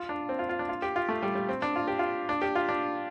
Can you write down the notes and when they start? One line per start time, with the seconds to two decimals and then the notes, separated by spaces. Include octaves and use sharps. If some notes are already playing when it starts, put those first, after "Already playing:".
Already playing: F4
0.09 D4
0.29 C4
0.39 F4
0.49 F4
0.59 D4
0.69 F4
0.82 G4
0.96 F4
1.09 A3
1.23 G3
1.35 G3
1.49 C4
1.62 D4
1.76 F4
1.88 G4
1.99 F4
2.29 D4
2.42 G4
2.55 F4
2.69 D4